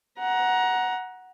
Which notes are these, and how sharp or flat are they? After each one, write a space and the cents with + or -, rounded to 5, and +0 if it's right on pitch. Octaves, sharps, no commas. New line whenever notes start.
F#5 +0 A#5 +20